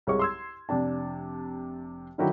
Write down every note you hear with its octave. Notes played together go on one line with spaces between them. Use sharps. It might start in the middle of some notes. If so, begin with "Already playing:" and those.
C2 G#3 C#5 C#6
C6 E6 G#6
F1 C3 D4 A5
D3 D#3 F#3 E4 F#4 G4